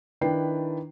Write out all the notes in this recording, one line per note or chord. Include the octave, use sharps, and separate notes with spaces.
D#3 D4 E4 B4 G5 C7